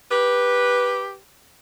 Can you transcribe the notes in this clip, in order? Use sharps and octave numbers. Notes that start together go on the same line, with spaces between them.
G4 B4